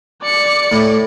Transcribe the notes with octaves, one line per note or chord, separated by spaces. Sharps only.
D5 C#7
A2